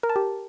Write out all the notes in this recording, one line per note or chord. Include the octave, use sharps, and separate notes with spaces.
A#4
A5
G4